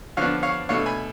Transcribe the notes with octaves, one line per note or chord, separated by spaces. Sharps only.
D3 F3 B3 D4 C#5 F5
C#5 F5
B2 A3 D4 C#5 F5
G#5 B5